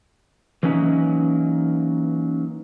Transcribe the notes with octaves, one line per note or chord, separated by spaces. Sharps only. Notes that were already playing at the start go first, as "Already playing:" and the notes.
E3 F#3 A#3 C#4 D#4